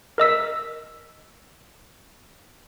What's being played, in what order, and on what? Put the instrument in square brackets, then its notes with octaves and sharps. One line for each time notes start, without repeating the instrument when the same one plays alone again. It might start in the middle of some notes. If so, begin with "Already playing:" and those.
[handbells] A#4 D#5 E6 B6